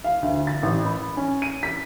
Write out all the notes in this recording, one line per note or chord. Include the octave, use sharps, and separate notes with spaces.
F5
D2
A6
A1
B5
C#4
D#7
B6